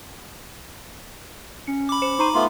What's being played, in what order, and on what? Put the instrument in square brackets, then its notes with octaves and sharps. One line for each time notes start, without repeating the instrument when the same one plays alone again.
[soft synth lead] C#4 [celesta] C#7
[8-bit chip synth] B5 D6
[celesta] C5 C#7 E7
[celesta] D#4 A#5 D#7 [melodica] C5 C6 [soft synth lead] C#6
[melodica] A3 B3 F4 [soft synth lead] C6